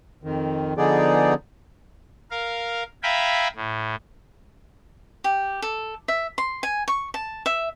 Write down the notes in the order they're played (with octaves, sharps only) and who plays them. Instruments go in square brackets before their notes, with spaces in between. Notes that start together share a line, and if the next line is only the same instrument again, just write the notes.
[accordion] F2 D#3
D3 F3 B3 D#4 G#4 D5
[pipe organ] A#4 F5
E5 F5 G5 G#5 A#5 B5
A2
[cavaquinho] G4
A4
E5
C6
G#5
C#6
A5
E5